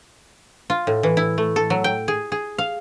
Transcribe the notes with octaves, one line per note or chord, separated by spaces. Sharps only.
F4
A2
E3
E4
A3
A4
F#3
G5
G#4
G#4
F5